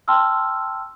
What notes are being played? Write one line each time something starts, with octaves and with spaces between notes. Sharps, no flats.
G5 A5 C6 E6 F6